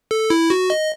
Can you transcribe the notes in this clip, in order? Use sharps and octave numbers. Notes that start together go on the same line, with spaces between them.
A4
E4
F#4
D#5